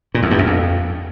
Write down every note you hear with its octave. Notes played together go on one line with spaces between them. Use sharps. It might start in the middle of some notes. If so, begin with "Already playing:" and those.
A#2
E2
G2
F#2
F2